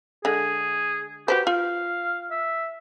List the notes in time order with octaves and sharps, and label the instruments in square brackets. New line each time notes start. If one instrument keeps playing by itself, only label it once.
[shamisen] D3 G#3 [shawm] G#4
[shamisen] F#4 B4 C5 [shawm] G4
[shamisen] F4 [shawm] F5
[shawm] E5